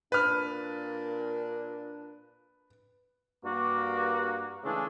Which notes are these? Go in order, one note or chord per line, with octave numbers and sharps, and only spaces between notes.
A#2 D4 B4 F6
G2 A#3 F#4
C#3 E3 G#3 A3 D4 G#4